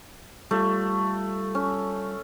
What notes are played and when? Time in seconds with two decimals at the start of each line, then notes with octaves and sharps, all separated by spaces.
0.51 G3 A3 F4
1.55 C#4